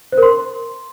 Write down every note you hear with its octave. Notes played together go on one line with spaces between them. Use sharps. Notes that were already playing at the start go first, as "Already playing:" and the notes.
C5
A#4
C6